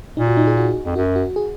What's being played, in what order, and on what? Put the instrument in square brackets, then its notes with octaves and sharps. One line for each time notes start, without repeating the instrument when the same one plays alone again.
[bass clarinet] A#2 [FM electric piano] D#4
[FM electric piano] F#4
D#4
G#4
F#4
[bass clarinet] F2
[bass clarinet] F#2 [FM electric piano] F#4
[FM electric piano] F#4
G#4